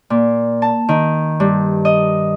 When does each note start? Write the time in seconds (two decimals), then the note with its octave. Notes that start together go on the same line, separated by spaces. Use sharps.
0.10 A#2
0.62 A5
0.89 D#3
1.40 G2
1.85 D#5